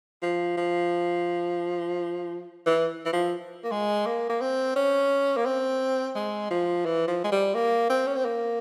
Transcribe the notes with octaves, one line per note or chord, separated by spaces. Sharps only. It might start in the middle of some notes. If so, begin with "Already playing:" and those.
F3
F3
E3
E3
F3
A#3
G#3
A#3
A#3
C4
C#4
A#3
C4
G#3
F3
E3
F3
G#3
G3
A#3
C4
C#4
C4
A#3